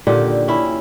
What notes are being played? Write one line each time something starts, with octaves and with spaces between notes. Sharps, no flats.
A#2 D3 D#3 G4
C#4 E4